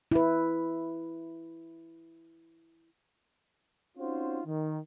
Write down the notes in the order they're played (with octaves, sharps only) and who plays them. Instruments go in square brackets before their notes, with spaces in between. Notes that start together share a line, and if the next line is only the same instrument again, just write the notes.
[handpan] E4 B4
[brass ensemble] C4 C#4 D#4 F4 F#4 C5
D#3